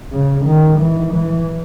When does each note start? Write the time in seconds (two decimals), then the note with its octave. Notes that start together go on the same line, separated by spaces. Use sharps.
0.13 C#3
0.46 D#3
0.80 E3
1.14 E3